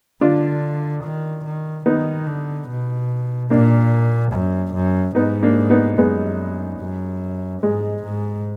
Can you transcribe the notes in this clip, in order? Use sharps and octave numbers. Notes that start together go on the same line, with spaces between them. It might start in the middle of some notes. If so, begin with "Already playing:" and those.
D3 D4 F4
D#3
D#3
D#3 B3 D#4
D3
B2
A#2 A#3 D4
F#2
F#2
G#2 B3 D#4
A#3 D4
B3 D#4
F#2 G#3 B3
F#2
G#2 G#3
G#2